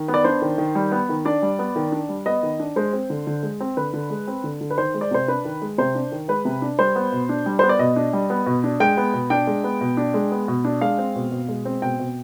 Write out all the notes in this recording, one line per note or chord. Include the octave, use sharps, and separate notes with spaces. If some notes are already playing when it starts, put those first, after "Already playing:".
Already playing: D#3
B3
D5
D4 C5
D#3
D#3
G3
B3
D#3
D4 D5
G3
B3
D#3
D4
G3
B3 D#5
D#3
D4
G#3 C5
C4
D3
D3
G#3
C4
D3 B4
D3
G#3
C4
D3
D3
B4
D#3 C5
G#3
D5
C3 C5
D4 B4
D#3
G#3
C3 C5
D4
D#3
G#3 B4
C3
D4
G3 C5
B3
B2
D4
G3
B3 C5
D5
B2 D#5
D4
G3
B3
B2
D4
G#3 G5
B3
B2
D4 G5
G#3
B3
B2
D4
G#3
B3
B2
D4
G#3 F5
C4
B2
B2
G#3
C4
B2 G5
B2